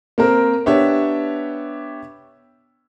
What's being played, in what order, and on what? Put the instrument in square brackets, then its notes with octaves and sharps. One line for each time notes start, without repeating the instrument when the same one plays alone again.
[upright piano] A#3 C4 A#4
B3 D4 G4 C#5 E5